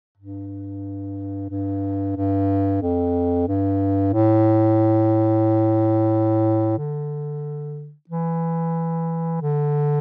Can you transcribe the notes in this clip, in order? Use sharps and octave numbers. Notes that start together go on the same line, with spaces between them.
G2
G2
G2
F2
G2
A2
D3
E3
D3